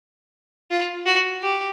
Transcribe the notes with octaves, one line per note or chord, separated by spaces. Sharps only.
F4
F#4
G4